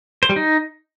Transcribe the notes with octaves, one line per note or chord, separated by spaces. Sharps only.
C5
G3
D#4